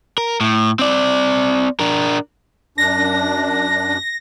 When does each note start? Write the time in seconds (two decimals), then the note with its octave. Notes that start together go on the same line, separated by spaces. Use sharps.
0.18 A#4
0.41 A2
0.79 C4 D5
1.80 D4 A#4
2.78 F#2 D4 A#6